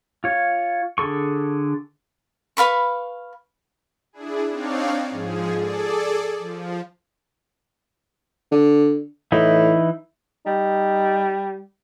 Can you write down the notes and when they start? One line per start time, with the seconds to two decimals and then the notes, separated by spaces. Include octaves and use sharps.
0.24 F4 C#5
0.98 D3 G#4 A4 C#6
2.57 B4 F5 B5 C#6
4.13 D4 E4 G#4
4.50 C4 D4 D#4 C#5 D5 F5
5.10 G#2 F3 G#4
5.57 G#4 A4 D5
6.39 F3
8.52 D3
9.32 A2 E3 D#4 E4
10.46 G3 D#4